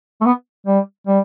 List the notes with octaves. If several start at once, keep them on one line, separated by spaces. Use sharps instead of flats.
A3
B3
G3
G3